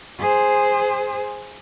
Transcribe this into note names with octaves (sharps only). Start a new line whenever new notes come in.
G#4 C5